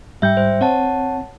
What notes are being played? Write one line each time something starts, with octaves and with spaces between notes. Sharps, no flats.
G#2 G3 E5 G5 G6
C5
C4 C#5 F#5 A5